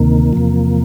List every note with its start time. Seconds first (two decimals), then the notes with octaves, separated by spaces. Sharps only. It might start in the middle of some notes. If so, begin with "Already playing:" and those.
Already playing: D2 C3 D#3 A#3
0.33 E2 C3 F3